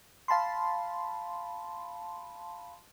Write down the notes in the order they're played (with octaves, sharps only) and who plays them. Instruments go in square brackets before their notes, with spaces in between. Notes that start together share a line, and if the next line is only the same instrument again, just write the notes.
[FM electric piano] F5 A5 B5 C6